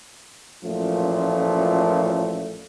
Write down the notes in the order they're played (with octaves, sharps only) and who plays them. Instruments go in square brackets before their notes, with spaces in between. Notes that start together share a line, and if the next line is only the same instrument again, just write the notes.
[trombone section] A1 F#2 A#2 F3 A3